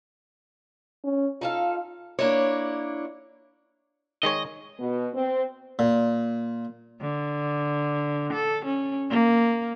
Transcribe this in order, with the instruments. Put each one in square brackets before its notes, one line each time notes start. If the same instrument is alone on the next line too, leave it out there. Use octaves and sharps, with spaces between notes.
[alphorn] C#4
[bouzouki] D#4 A4 F5 [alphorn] F4
[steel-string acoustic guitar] A#3 D4 E4 C#5
[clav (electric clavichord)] D#3 G#3 C#5 [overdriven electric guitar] D#5
[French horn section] B2
C4
[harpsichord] A#2
[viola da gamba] D3
A4
C#4
A#3